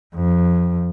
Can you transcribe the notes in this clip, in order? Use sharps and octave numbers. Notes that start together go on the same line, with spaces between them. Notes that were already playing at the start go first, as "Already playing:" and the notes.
F2